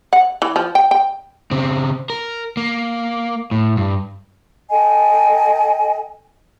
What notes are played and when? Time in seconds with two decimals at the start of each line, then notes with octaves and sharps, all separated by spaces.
0.13 F#5
0.42 E3
0.56 F3
0.75 G5
0.91 G5
1.51 C#3 C4
2.10 A#4
2.57 A#3
3.51 A2
3.77 G2
4.71 A4 D#5 G5 G#5